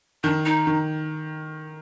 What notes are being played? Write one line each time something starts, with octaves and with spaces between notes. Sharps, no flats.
D#3 D4
D#4
D#3